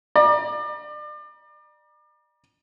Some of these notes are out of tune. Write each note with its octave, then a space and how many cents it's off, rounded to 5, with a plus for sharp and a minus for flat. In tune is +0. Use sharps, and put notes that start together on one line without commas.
D5 +35 A#5 +40